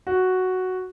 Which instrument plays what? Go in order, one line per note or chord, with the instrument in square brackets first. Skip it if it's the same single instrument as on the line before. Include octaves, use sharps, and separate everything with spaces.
[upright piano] F#4